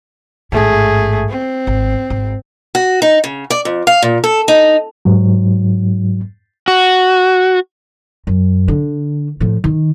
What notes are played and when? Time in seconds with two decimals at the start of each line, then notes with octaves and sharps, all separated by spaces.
0.52 A1 G#2 A3 G#4
1.29 C4
1.67 G#1
2.10 G#1
2.75 F#4
3.02 D#4
3.24 C#3
3.50 D5
3.65 F2
3.87 F5
4.02 A#2
4.24 A4
4.48 D#4
5.05 G#2 F#3
6.68 F#4
8.27 F#2
8.68 D3
9.40 A2 F3
9.64 D#3